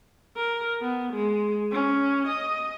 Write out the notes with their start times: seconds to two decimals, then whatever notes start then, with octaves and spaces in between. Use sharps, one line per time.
0.37 A#4
0.82 B3
1.13 G#3
1.72 C#4
2.27 D#5